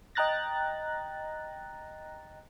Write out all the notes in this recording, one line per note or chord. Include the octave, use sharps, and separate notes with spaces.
D#5 G5 A#5 F#6 A6 A#6